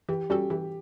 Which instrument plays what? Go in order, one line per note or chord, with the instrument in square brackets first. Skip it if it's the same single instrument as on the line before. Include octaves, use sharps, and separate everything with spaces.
[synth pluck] E3 [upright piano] G4
[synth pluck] G3 C#4 F#4 A4 [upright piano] G4
[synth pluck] E3 [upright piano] G4